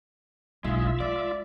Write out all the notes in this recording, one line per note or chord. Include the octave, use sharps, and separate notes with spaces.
F#1 B1 G#3 F4 E5
G#3 D5